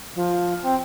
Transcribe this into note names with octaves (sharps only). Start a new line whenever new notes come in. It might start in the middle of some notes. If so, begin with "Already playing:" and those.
F3
C4